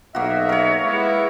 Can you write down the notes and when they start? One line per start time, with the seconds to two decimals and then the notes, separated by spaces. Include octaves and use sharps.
0.15 B1 A#3 F#4 D#5 E5
0.49 A#4 C#5
0.84 G#3 B3 E4